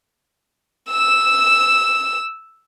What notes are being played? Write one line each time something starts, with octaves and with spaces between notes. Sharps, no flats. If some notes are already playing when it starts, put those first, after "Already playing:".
E6 E7